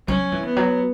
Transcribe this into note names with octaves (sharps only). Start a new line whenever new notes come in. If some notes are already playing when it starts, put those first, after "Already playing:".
F#3 C#4
E3
B3
F#3